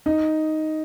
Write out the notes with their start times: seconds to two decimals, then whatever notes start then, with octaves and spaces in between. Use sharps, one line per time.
0.06 D#4